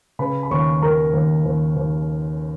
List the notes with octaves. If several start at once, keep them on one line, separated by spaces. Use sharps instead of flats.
C#3 B4 B5
B5
D#2 C#5 C#6
D#2 A#4 A#5
D#2
D#2
D#2